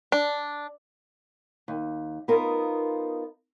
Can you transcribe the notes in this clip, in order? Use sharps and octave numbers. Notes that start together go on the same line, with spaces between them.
D4
D#2
B3 D#4 F4 A#4